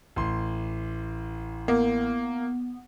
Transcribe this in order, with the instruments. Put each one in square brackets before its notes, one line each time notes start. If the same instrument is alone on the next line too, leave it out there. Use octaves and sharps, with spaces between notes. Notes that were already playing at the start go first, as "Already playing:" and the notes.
[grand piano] A1 C6
[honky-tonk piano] A#3 [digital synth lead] B3